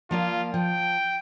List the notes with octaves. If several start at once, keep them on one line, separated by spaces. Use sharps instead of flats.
F3 A#3 F4 D5
F3 G5